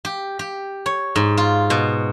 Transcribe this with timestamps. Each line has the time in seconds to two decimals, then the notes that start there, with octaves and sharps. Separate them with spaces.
0.05 G4
0.39 G4
0.86 C#5
1.16 G#2
1.37 F4
1.70 B2